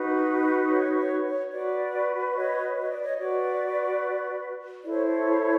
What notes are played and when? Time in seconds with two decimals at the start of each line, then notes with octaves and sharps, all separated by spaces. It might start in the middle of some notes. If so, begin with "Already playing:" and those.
Already playing: D#4 F#4 B4
0.70 C#5
0.97 C#5
1.25 C#5
1.52 F#4 B4 D5
2.30 D5
2.35 C#5 D#5
2.77 D#5
2.90 D5
3.02 C#5 D#5
3.18 F#4 B4 D5
4.83 E4 A4 C5 D5
4.93 C#5
5.12 C#5